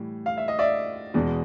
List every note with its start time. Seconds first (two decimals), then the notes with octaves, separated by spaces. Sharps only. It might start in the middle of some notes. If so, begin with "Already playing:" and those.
Already playing: A2 E3 G3
0.26 F5
0.37 E5
0.48 D#5
0.59 D5 E5
1.14 E2 B2 G#3